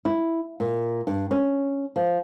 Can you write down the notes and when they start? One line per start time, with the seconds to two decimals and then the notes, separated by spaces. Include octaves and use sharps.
0.05 E4
0.60 A#2
1.07 G2
1.31 C#4
1.96 F3